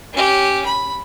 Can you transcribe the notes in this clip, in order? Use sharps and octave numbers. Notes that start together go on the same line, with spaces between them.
C#4 G4
B5